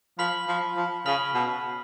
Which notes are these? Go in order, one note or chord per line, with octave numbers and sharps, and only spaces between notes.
F3 B5 F6 B6 F#7
F3
F3
C#3 B5 F6 B6 F#7
B2